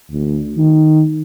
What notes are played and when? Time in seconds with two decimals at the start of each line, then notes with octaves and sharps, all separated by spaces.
0.12 D2
0.58 D#3